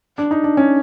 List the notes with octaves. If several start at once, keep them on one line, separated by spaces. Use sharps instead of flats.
D4
D#4
D4
C#4